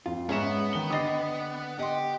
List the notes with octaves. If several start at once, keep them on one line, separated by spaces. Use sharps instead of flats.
F2 F4
G#2 B3 C#4 G#4 E5 A#5 C#6 E7
D#3 G7
D3 G4 D#5 D#6 A6 C7
G4 D#5 F#5 C6